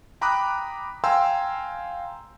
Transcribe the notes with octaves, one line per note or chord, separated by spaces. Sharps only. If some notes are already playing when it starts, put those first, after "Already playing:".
G5 A#5 B5 D6 D#6 F#6
F5 G5 G#5 A#5 C6 E6